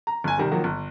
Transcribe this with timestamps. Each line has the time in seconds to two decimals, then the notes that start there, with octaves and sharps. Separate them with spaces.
0.07 A#5
0.24 G1 G#5
0.38 C3 D#3 G3
0.52 D#3 F3 F#3 A#3
0.64 G1